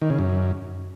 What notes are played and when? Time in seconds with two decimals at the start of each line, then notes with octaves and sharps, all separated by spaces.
0.02 D#3
0.10 C#3
0.19 F#2